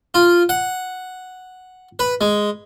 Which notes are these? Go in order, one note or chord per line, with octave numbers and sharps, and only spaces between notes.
F4
F#5
B4
G#3